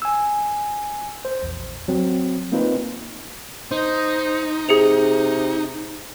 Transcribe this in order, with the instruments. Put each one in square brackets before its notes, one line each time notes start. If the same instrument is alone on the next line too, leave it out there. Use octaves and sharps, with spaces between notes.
[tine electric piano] G#5 E6
C5
A#1 E2
F#3 C4
A#3 C4 D#4 F4 B4
[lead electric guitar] D#4 [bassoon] C5
[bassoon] C3 [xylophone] G#4 C#7 F7